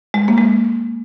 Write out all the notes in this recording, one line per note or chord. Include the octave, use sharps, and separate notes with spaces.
G#3
A#3
G#3